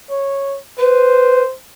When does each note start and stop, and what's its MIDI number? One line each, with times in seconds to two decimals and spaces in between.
0.11 0.58 73
0.79 1.42 71
0.79 1.54 72